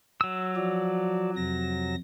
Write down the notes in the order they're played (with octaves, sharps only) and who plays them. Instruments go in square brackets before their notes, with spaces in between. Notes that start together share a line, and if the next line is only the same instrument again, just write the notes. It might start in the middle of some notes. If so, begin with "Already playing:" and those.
[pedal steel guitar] F#3 E6
[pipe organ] F3 F#4 D5
F2 C3 A#6